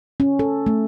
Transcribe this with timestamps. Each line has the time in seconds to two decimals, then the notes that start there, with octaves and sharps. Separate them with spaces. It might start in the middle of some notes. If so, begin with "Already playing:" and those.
0.20 C#4
0.39 A4
0.66 A3